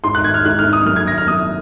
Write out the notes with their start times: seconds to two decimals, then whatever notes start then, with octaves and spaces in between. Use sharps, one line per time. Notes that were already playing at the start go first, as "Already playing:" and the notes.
0.04 G#2 C6
0.15 F#6
0.24 D#3 G#6
0.34 F6
0.45 G#2 F#6
0.59 F6
0.66 D#3
0.73 D#6
0.86 F#2 F6
0.96 G#6
1.07 D#3 A#6
1.18 F6
1.27 F#2 D#6